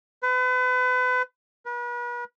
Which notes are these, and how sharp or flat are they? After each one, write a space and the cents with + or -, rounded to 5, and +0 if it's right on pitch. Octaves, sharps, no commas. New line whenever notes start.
B4 +35
B4 -40